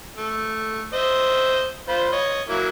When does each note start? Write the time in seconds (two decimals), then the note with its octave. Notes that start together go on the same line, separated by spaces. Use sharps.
0.17 A3
0.93 C5 D#5 E5
1.89 F4 C5 B5
2.12 C#5 D#5
2.49 F#3 A#3 E4